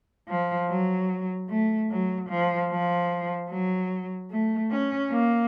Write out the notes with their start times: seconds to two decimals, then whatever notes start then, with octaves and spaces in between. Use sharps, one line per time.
0.28 F3
0.69 F#3
1.49 A3
1.90 F#3
2.29 F3
2.70 F3
3.51 F#3
4.31 A3
4.71 C#4
5.11 A#3